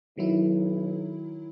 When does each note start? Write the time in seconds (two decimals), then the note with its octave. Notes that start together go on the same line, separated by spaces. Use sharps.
0.17 B1 D#3 F#3 E4